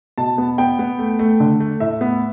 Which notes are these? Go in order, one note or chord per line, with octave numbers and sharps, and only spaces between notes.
B2 A5
B3
B3 G5
B3
A3
A3
D3
A3
A2 E5
B3